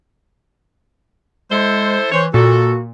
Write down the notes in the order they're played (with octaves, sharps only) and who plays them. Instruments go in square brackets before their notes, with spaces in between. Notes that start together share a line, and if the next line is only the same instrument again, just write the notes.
[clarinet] G#3 [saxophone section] E4 A4 C5
[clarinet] E3 [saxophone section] C5 C#5
[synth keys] A#2 [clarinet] F#4 [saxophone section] A4